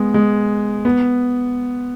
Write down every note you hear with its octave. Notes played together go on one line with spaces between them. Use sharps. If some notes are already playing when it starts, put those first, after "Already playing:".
Already playing: G#3 B3
G#3
B3